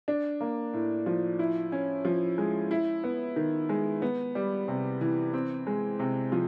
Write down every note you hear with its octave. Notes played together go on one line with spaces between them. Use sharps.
D4
A#3
A2
F3
E4
C#4
F3
G#3
E4
B3
D#3
G#3
B3
G3
C3
E3
C4
G#3
C3
F3